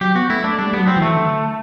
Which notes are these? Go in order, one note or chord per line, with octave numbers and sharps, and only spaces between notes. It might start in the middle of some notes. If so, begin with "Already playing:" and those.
F#3 G4
B3 F#4
A3 E4
A3 D4
G3 D4
F#3 G3 B3
C4
E3
A3
D3